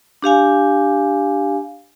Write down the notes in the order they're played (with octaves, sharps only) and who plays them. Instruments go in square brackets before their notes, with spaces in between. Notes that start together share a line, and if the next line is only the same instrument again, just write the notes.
[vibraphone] D4 G4 F5 G#5